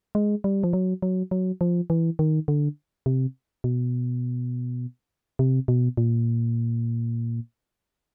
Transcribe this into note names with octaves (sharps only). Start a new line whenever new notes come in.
G#3
G3
F3
F#3
F#3
F#3
F3
E3
D#3
D3
C3
B2
C3
B2
A#2